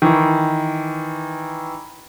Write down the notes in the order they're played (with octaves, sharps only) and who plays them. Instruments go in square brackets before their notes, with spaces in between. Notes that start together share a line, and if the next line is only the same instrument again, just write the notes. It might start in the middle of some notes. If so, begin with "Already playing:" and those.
[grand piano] D#3 E3